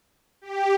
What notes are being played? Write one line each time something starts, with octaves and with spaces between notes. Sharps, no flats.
G4